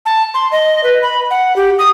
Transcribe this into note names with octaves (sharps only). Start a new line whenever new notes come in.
A5
C6
D#5
B4
B5
F#5
G4
D#6